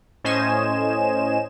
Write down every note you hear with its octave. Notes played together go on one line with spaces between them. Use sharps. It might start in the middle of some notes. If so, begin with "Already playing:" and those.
A2 C#4 C5 D#5 G#5 E7